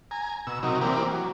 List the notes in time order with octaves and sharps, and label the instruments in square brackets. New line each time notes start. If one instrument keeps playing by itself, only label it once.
[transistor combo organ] G#5 A#5
B2 E6
C3 F#3 D#4 A#4
E3 A#3 C4 G4 A#4 D5
F#3